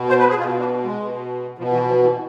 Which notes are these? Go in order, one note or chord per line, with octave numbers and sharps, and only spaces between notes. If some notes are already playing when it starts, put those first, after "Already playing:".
Already playing: B2
C5
B4
G#4
B2 F4
D4
G#3
B2
B2 F3
E3
F3
E3